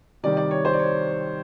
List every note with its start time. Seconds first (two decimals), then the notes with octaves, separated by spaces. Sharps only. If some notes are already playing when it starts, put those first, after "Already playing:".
0.23 C3 D#3 G3 D5
0.37 D5
0.51 C#5
0.65 C5
0.73 D5
0.79 C#5